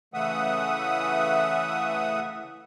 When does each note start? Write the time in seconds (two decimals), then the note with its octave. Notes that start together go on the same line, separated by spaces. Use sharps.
0.14 C#3 E3 A3 E5 F#5 D#6